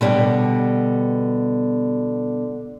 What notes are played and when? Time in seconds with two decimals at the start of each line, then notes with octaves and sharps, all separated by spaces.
0.01 B2 D3 G3